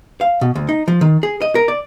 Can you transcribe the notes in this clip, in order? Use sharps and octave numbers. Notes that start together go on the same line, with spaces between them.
F5
B2
D2
D#4
F3
D#3
G#4
D#5
A#4
D5